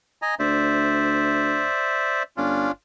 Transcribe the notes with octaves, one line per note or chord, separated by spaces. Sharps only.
D#5 G#5 A#5
D2 C5 D5 E5
G1 C#4 D4 F4